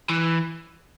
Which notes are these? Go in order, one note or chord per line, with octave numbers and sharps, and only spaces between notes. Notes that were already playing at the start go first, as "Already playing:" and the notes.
E3